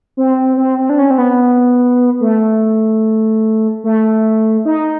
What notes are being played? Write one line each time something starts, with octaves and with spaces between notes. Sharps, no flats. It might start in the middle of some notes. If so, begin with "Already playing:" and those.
C4
C4
C4
D4
C#4
C4
B3
A3
A3
D#4